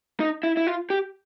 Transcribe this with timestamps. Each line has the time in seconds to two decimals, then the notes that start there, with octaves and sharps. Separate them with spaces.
0.20 D#4
0.43 E4
0.57 E4
0.67 F4
0.90 G4